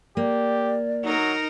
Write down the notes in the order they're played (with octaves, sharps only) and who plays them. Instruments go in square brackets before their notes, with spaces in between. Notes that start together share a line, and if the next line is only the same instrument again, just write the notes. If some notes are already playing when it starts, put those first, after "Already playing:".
[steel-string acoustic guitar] A#3 [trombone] G4 [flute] D5
[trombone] F#3 [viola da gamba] D#4 A#4